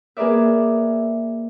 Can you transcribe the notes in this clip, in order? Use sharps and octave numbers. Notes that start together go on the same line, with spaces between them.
A#3 G#4 A#4 B4 D5 E5